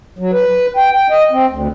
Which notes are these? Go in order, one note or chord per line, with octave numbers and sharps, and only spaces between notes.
F#3
B4
G5
G5
D#5
C4
D2